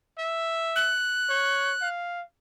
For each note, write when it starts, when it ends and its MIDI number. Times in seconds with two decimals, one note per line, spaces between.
0.18 0.95 76
0.76 1.89 90
1.29 1.73 73
1.82 2.22 77